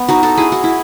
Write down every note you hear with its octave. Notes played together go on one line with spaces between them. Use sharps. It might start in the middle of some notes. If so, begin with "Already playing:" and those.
Already playing: B3
D#4 F#4
F#4 A4
E4 G#4
F#4
E4